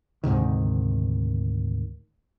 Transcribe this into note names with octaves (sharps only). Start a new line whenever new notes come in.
D2 G#2 C3 D#3